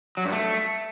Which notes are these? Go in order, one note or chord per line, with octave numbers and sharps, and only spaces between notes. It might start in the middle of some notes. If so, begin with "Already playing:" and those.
F#3
G2
A3